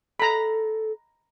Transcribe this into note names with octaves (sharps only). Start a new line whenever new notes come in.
A4 A#5 B5